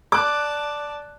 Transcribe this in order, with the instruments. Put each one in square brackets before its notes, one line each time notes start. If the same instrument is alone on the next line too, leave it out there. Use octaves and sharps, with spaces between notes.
[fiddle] D5 A5 [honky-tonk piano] D6 F#6